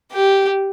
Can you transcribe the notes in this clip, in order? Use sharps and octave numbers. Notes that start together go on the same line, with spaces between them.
G4